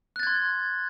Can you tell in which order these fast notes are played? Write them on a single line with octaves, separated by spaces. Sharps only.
F#6 A6 G#6 C6